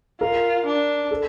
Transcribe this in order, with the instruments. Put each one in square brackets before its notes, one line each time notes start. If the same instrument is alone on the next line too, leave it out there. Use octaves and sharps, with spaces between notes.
[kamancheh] F4 [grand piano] A#4
[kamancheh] D4
[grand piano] A4